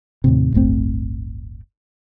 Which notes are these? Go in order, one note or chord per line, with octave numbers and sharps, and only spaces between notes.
D#2 A2 C3
D1 G1 A3 C4